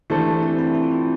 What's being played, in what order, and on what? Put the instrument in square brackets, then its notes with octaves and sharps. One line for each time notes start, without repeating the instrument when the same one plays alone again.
[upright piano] E3 A3 D4 A4 C5 [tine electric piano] E4 G4
[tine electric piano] C4 E4
C4 E4
E4
F4
C4 E4